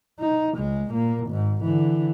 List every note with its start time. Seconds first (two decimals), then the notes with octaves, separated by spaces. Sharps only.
0.19 D#4
0.55 C#2 G#3
0.91 A#2 A#3
1.27 G#1 G#2
1.64 D3 E3